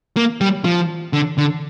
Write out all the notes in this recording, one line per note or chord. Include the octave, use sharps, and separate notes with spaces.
A#3
G3
F3
D3
D3